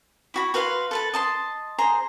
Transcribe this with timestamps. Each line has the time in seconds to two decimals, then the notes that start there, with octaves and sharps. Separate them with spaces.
0.34 E4 F#4 B5
0.54 F#4 B4 F5 C6
0.91 A4 B4 A5
1.14 D#5 A5 C6
1.78 G#4 C5 A#5